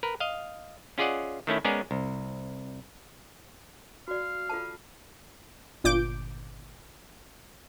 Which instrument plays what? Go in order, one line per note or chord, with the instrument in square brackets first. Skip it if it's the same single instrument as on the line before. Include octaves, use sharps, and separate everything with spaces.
[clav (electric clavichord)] A#4 B4
D#5 F5
C#4 F4 G#4 D5 D#5 F#5
D#3 A3 C#4 E4
G#3 B3 C#4 G#4 A#4 D5
C2
[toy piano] F#4 D5 [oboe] F5
[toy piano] F4 A4 A5
[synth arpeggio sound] G1 A#2 D6 G6 D7